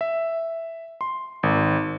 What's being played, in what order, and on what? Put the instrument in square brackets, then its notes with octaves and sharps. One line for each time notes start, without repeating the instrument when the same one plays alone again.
[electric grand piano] E5
C6
G#1